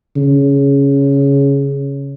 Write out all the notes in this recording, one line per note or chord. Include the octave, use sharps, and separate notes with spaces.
C#3